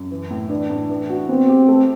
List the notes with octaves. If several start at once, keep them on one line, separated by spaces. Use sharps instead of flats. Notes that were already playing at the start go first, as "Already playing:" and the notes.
Already playing: F#2
E3
A2
E3 D4
A2
E3
F#4
B3 C4
G4
A3